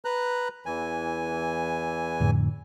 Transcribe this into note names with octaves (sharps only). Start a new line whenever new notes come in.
B4 A#5 F#6
E2 E3 G#5
F2 A2 D3